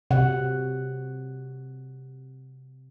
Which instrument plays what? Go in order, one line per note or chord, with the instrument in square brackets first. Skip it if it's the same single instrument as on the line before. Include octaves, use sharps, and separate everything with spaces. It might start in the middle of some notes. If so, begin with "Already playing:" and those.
[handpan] C3 F#5